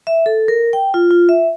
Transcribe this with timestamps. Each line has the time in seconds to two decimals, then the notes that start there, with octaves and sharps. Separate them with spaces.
0.07 E5
0.26 A4
0.48 A#4
0.73 G5
0.94 F4
1.11 F4
1.29 E5